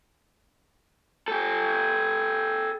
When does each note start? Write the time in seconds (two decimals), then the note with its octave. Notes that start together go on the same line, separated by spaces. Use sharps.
1.28 G4 A4